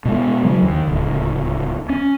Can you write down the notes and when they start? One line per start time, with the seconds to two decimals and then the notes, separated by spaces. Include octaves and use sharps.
0.05 B2 G#3
0.44 C#3 F#3
0.62 D#2
0.87 D1 C#2
1.90 C#4